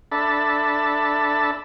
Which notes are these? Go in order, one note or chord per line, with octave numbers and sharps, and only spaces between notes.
D4 A4 E5 A5 B5